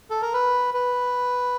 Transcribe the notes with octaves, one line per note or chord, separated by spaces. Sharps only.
A4
A#4
B4
B4